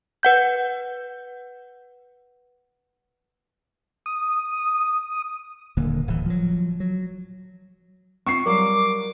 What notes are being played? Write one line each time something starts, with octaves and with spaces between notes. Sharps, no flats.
B4 F#5 G6
D#6
D#1 D3 A#3
D1 E3
F3 F#3
F#3
C4 F4 C#6 C7
F#3 G3 A#4 F5 D6